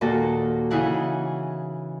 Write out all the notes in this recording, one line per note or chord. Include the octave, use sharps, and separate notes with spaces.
D#2 A#2 F#4 A4
C#3 E3 D#4 E4 G#4 F#5